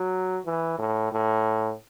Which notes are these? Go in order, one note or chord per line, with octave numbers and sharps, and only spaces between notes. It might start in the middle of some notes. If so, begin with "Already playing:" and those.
Already playing: F#3
E3
A2
A2